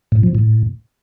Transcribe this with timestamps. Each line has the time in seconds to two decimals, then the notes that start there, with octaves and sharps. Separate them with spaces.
0.12 A2
0.23 F3
0.35 A2